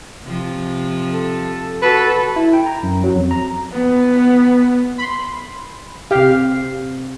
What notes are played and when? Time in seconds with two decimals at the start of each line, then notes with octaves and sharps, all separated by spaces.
0.24 C3 F3
1.12 A4
1.82 F#4 A4 B4
2.36 E4
2.53 G5
2.66 A#5
2.83 F#2
3.04 F#3
3.15 F2
3.31 A#5
3.72 B3
4.98 B5 C6
6.11 C3 G4 F5